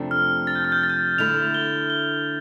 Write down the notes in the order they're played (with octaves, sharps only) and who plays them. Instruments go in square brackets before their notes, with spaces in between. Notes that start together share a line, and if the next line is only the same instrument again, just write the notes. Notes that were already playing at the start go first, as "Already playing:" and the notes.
Already playing: [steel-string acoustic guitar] F2 C3 F3 A3 D4
[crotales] F6
A6
G6
F6
G6
A6
G6
A6
[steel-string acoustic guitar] D3 A3 E4 [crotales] F7
[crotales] G7
G7